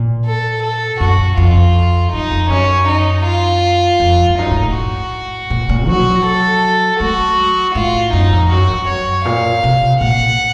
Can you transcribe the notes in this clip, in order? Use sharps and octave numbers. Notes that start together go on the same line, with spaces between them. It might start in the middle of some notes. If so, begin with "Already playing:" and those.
Already playing: A#2
A4
A4
F#2 F#4
F2 F4
F#2 D#4
F2
F#2 C#4
D#4
F4
F2
F2
F#2 D#4
A2
A2
F#4
A#2
A#2
F#3 F#4
A4
A3 F#4
F#3
A2 F4
F#2 D#4
F2
F#2 F#4
F#2
F#2 C#5
A#2 F5
C3
A#2 F#5